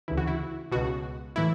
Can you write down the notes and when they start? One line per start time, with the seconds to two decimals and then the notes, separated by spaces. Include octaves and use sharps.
0.08 D2 C#3 E3 E4
0.18 F#4
0.27 E4
0.72 C#2 B2 F#4
1.36 A2 E3 E4